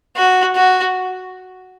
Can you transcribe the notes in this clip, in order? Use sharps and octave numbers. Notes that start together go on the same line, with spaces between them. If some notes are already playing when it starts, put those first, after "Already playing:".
F#4
F#4